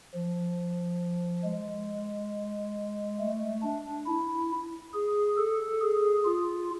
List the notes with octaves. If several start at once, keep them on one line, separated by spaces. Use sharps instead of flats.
F3
G#3
A3
D4
E4
G#4
A4
G#4
F4